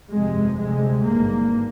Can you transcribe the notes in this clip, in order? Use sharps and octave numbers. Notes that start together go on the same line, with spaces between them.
G1 F2 C3 G#3
D2 C3 G#3
G#1 G2 A#3